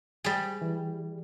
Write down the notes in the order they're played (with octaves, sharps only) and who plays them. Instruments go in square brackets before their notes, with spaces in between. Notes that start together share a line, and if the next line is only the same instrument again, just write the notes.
[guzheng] G3 G#4
[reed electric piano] E3